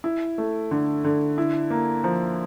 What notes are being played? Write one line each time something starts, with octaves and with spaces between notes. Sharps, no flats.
E4
A3
D3
D3
E4
A#3
F3